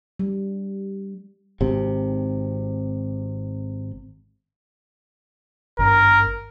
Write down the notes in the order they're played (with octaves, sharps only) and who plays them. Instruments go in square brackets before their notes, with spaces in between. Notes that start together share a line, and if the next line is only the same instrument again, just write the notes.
[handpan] G3
[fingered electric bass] G#1 C3
[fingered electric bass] G#1 G2 [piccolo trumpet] A#4